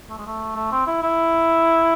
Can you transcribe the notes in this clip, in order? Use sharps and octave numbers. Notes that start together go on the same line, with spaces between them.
A3
G#3
A3
A3
C4
E4
E4